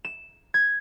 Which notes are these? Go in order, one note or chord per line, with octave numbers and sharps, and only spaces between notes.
E7
G#6